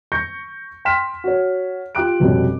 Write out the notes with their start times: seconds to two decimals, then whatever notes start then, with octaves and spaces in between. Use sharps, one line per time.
0.12 C#6 G6 A#6 C#7
0.85 G5 C6 F6 B6 E7
1.24 F#4 C#5
1.95 F4 G4 G5 D6 F#6 D7
2.20 F1 B2 G3 C#4